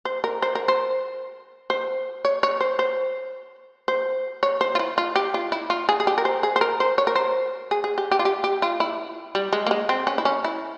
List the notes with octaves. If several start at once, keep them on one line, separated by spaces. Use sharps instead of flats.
C5
A#4
C5
A#4
C5
C5
C#5
C#5
C5
C5
C5
C#5
C5
F4
E4
F4
G4
F4
E4
F4
G#4
G#4
G4
A#4
C5
G#4
C5
A#4
C5
C#5
A#4
C5
G#4
G#4
G4
G4
F4
G4
G4
F4
E4
G3
G#3
A#3
G#3
C4
C#4
E4
C#4
E4